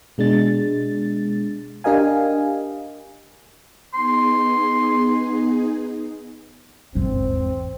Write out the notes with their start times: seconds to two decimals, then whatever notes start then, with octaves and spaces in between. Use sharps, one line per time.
0.18 B2 G#3 D4 A6
1.84 D4 G4 A#4 D#5 F5 G#5
3.94 B3 D#4 G#4 C6
6.95 G#1 E2 C4